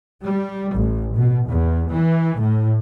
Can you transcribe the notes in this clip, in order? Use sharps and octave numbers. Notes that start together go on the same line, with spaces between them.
G3
A1
B2
E2
E3
A2